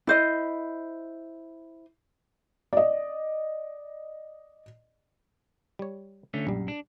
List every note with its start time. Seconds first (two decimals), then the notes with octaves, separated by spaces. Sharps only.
0.07 E4 C5 D#5
2.73 D5 D#5
5.79 G3 C#5
6.34 D3 A3 C#4
6.47 A#1 F#2 G3
6.68 D4